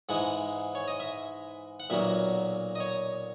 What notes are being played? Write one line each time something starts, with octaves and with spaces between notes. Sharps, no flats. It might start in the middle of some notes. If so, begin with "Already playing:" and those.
G#2 E3 G#3 F#5
C#5
D#5
E5
F#5
B1 A#2 F#3 A#3 E5
D#5
C#5